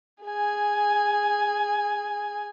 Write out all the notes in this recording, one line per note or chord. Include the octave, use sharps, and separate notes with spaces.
G#4 G#5